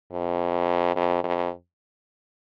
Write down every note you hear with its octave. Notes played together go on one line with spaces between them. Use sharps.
F2
F2
F2